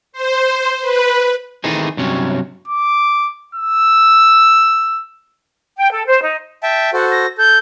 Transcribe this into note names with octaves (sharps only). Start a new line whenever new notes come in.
C5
B4
D#3 E3 A3 C4 D#4 G#4
G2 C3 F#3 C#4
D6
E6
G5
A4
C5
D#4
E5 G5 A5
F#4 A4 C5 F#5
A#6
A4 G6